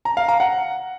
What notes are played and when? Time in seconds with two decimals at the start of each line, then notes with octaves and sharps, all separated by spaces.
0.05 A#5
0.17 F5
0.28 A#5
0.40 F#5